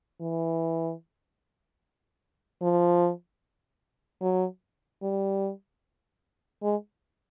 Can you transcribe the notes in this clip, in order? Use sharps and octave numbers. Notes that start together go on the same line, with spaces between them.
E3
F3
F#3
G3
G#3